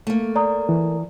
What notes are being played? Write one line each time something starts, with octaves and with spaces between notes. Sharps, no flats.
A3 A#3
D5 A#5 D#6
E3